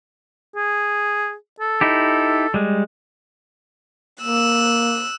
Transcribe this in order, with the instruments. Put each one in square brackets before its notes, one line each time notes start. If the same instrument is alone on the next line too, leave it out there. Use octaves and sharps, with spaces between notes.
[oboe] G#4
A4
[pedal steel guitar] D#4 E4 G4
G3 G#3
[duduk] A#3 [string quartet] E6 F#6